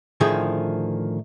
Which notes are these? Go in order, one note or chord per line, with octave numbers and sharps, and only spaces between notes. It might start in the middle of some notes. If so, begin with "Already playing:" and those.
A2 D3 D#3 F3 G#4